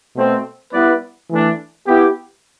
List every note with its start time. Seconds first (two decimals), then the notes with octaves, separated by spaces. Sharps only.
0.15 B2 A3 C4
0.72 G3 B3 E4 B4 D5
1.29 E3 A3 D4
1.86 B3 E4 G4